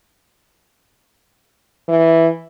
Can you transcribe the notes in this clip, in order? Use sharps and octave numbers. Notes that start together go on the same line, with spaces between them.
E3